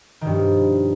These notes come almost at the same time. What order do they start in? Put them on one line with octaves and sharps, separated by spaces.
D#3 B2 G2 F3